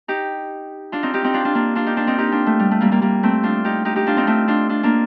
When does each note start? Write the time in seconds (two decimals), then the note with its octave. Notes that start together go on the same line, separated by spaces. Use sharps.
0.08 D#4 G4
0.92 D4 F4
1.03 C4 D#4
1.14 D#4 G4
1.24 C4 D#4
1.34 D4 F4
1.44 D4 F4
1.55 A#3 D4
1.75 D4 F4
1.86 D#4 G4
1.97 D4 F4
2.07 C4 D#4
2.18 D#4 G4
2.32 D4 F4
2.46 A3
2.59 G3
2.71 A3
2.81 G3 A#3
2.91 G3 A#3
3.01 G3 A#3
3.23 A3 C4
3.43 D4 F4
3.65 D#4 G4
3.85 D#4 G4
3.96 D#4 G4
4.07 D4 F4
4.17 C4 D#4
4.27 A3 C4
4.48 D4 F4
4.69 D4 F4
4.83 A#3 D4